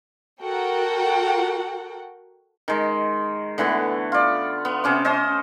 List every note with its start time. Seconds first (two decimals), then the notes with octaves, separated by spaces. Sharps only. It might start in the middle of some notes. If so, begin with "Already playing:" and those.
0.41 F#4 A4 A#4 F#5 G5
2.68 D#3 G#3
3.58 D3 E3 A3 B3
4.12 F4 D5
4.65 B3
4.84 C3 C#4 D6
5.05 C#4 C5 D#5